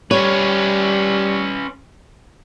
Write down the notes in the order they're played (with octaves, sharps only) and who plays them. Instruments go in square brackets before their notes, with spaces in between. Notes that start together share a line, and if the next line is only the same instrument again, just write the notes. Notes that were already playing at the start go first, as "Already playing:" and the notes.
[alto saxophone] G3 [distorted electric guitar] C#4 B4 [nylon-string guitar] C#5